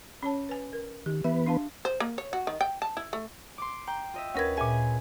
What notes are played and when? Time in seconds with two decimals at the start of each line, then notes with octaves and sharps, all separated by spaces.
0.23 C#4 C#5 A5
0.49 B4 G#5
0.73 A#4
1.06 D#3 G4
1.24 E3 B3 B4 E5
1.46 D4 F5 A5
1.85 C5
2.00 A#3
2.18 C#5
2.33 F#4
2.47 D#3
2.61 G5
2.82 A5
2.97 E4
3.13 A3
3.58 C6 D6
3.87 G5 A#5
4.14 F4 D#5 E5
4.35 D2 C#4 A#4 B4 G#6
4.57 A#2 G#4 E5 G#5